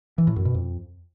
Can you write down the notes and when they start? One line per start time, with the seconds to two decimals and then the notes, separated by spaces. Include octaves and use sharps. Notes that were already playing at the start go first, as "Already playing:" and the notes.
0.18 E3
0.27 A2
0.36 F#2
0.45 B2
0.54 F2